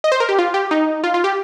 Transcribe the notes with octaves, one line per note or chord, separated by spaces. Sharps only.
D#5
C5
A#4
G4
F4
G4
D#4
F4
F4
G4